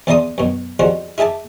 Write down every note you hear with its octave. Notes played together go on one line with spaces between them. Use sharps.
E2 E4 D5 A#5 C6 D#6
F#2 B2
F3 G3 G#3 C4 F#4
E4 G#4 E5 A5 D6